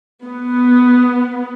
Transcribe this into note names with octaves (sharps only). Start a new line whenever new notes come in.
B3